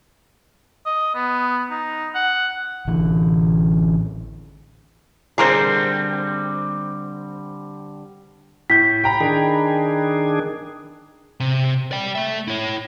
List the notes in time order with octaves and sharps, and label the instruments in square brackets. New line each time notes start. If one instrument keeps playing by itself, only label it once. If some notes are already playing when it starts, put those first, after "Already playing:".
[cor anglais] D#5
B3
D#4
F#5
[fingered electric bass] A1 A2 D3 E3
[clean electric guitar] D3 G3 C4 [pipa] G#4 A#4 C5
[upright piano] A2 G6 [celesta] B6
[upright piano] G5 A#5 B5
[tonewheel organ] D#3 D4 G#4
[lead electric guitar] C3
D5 G5
A3 E5
E4 C#5